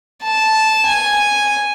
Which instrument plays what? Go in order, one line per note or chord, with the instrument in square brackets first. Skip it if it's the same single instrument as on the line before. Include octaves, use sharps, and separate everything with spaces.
[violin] A5
G#5